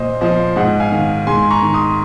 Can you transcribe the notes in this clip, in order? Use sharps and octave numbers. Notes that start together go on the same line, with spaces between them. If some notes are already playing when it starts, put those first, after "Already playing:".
Already playing: A#2 C5 D#5
F3 C5 D#5
G#2 D#5 F#5
F5 G#5
D#3
G#2 G#5 C6
A#5 C#6
D#3
C6 D#6